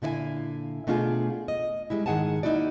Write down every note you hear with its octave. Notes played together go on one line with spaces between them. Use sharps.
A#2 D3 E4 D5 F5 G#5
B2 A3 D4 F4 G4 G#4
D#5
G3 G#3 E4
G#2 D#3 G#4 F#5 G#5 A5
A#3 D#4 E4 F#4 D5